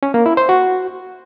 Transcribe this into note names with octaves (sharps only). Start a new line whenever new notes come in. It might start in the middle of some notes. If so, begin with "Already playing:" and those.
C#4
A#3
E4
C5
F#4